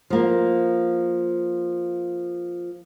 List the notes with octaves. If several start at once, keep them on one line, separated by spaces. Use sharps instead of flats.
F3 A#3